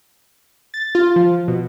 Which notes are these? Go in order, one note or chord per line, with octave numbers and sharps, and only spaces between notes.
A6
F4
F3
B2